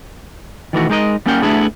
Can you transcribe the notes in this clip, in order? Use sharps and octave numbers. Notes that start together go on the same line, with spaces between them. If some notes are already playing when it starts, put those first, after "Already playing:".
D#3 E3 A3 F#4
G#3 D#4 A#4 D#5
G3 A#3 C#4 A#4 F#5 G5
A3 B3 D4 E4 G#4